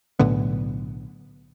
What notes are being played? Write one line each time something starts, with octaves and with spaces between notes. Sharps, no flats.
B1 A2 D3 B3